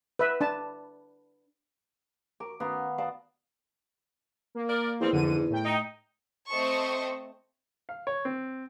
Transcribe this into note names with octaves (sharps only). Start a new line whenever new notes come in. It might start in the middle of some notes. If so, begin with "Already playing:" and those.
B4 E5
D4 A5
A#4 D6
D#3 B3 C#4 A#4 F5
D5 D#5 F5 A5
A#3
A#4 D5
E2 F3 G3 C4
F2 G#2 D3 D#7
A2 G5
D#4
A3 C4 C5 D#5 A5 C#6
F5
C#5
C4